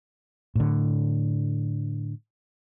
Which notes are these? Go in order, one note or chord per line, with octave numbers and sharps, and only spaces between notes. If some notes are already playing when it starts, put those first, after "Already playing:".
A2 D3